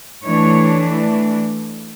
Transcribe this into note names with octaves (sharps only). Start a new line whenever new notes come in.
E3 A3 D4 C#5